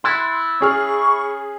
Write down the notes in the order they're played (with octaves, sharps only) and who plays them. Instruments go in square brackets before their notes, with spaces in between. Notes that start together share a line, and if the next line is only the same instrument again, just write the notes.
[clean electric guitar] E4 [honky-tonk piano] C6 F#6 A6
[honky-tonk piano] C#4 G#4 F6 [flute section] C#6